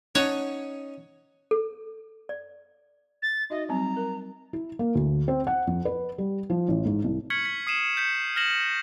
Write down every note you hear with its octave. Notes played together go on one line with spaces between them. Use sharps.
C#4 D#4 C#5 D#5 F#5 A5
A4
D5
A6
D#4 F#4 D#5 E5
F#3 G3 C4 A#5
A#4
E4
A#3
D2
C4
F#5
F2
B4
G3
F3
A1
G#2
C2
C#6 F6 G#6 B6 C#7 F#7
B6
D#6 C7 D#7 E7 F#7
G6 B6 C#7
F6 G#6 A#6 E7 F#7
F6